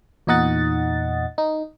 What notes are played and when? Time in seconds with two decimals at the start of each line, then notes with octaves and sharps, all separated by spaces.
0.27 E2 A#2 D#4 D#5 F#5 A6
1.38 D#4